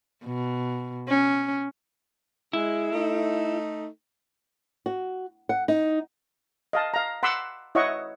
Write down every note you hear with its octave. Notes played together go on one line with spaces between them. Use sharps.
B2
C#4
G#3 E4
A3 D#4
F#4
F#5
D#4
D#5 F5 A5
F5 A#5
F#5 B5 C6 D6 E6
E4 C#5 D#5 E5 F#5 C#6